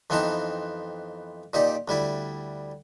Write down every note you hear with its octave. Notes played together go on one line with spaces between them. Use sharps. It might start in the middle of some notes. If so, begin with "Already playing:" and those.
F2 E3 B3 C4 D#4 A5
A#2 D#4 G4 D5
D2 G3 E4 D5